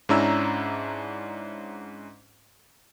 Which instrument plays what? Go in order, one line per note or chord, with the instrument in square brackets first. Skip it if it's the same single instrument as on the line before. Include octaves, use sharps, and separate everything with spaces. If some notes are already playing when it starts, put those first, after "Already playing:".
[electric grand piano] G#2 C#4 D4 E4 A#5 E6